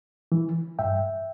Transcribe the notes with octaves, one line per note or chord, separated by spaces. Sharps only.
E3
G2 E5 G5